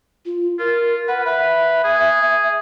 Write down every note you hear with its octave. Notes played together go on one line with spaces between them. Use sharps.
F4
F4 A#4
B4 F#5
B4 E5
G#4